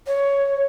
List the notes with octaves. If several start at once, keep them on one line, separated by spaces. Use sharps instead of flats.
C#5